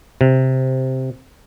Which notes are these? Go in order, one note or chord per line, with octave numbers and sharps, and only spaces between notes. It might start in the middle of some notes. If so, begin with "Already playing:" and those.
C3